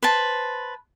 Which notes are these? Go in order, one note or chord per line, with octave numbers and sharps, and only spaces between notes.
B4 C5 A5